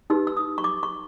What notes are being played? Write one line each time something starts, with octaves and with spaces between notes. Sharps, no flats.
D#4 G4 B4 E6
E6
D#6
C#6
D6
C#6